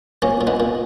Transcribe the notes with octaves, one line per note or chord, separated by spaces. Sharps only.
A#2 A#3 C#4
A#2
B3 D#4
A#2